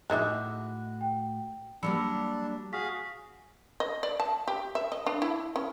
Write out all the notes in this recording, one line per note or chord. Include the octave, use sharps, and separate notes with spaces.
A2 G#3 D#4 F#4 E5 D6 F#6
G5
F#3 G3 A#3 D4 B5 E6 C#7
F#4 G#4 F5 B6
D#5
D5
A5
G4
E5
D#5
D4
E4
C#4